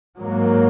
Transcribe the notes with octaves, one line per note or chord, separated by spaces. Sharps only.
G#2 F#3 A#3